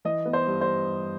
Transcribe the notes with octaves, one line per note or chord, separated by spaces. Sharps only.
E3 D#5
B3
C5
G2
C5